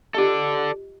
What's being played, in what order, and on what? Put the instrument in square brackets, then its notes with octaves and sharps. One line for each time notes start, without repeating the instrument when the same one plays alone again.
[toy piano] F4 G4 D#5 [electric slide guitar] A4 D5